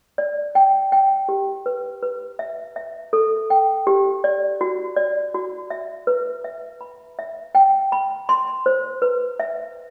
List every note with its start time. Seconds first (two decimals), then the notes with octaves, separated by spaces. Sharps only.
0.18 D5
0.55 G5
0.92 G5
1.29 G4
1.66 B4
2.03 B4
2.39 E5
2.76 E5
3.13 A4
3.50 G5
3.87 G4
4.24 D5
4.61 F#4
4.96 D5
5.34 F#4
5.70 E5
6.07 B4
6.44 E5
6.81 B5
7.19 E5
7.55 G5
7.92 B5
8.29 C6
8.66 C5
9.02 B4
9.40 E5